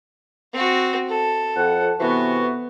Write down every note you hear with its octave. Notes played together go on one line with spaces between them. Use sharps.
C4 F#4
A4
F2 F#5
C3 E3 B3 F#4